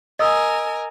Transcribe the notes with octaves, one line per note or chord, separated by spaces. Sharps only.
A#4 D#5 G#5 D#6 E6